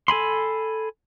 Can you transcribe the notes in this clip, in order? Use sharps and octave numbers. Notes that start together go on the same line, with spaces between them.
A4 G#5 B5 C6